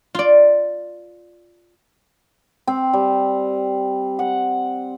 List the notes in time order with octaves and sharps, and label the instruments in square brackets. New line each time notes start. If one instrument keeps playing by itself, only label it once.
[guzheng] F4 D5
[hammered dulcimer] C4
G3
F#5